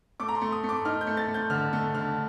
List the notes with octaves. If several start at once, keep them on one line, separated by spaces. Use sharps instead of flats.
A3 D6
A#5
C6
A3
D#6
A3
D6
D#4 F6
G6
A3
A6
A3
G6
D3 F6
A3
D3 F6